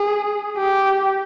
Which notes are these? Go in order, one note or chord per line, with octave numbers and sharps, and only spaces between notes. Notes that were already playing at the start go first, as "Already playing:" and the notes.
Already playing: G#4
G4